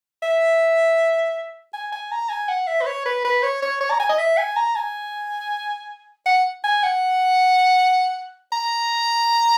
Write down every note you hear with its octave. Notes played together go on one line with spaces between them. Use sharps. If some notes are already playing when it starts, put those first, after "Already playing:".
E5
G#5
G#5
A#5
G#5
F#5
E5
B4
C#5
B4
B4
C#5
C#5
C#5
A#5
G#5
D#5
E5
G#5
A#5
G#5
F#5
G#5
F#5
A#5